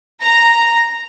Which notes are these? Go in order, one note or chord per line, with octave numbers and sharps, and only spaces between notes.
A#5